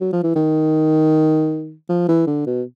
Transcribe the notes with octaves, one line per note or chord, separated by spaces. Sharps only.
F#3
F3
E3
D#3
F3
E3
D3
B2